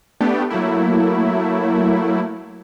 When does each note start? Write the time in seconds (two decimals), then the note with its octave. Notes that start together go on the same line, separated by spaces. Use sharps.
0.21 A3 B3 D4 G4
0.50 F#3 A3 A#3 E4